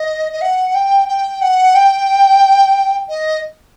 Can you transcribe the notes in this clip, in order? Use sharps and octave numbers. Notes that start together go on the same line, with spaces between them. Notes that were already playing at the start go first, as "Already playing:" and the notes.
Already playing: D#5
D#5
F#5
G5
G5
F#5
G5
D#5